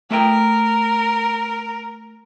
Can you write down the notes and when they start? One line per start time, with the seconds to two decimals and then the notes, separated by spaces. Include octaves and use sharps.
0.11 A3 A#4 E5 G5